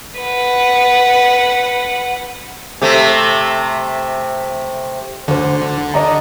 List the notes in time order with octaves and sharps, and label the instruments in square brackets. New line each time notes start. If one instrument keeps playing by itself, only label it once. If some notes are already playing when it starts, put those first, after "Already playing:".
[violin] B4 F#5
[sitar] C3 A3
[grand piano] D2 C5 [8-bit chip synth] D3
[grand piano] D5 D#5 A#5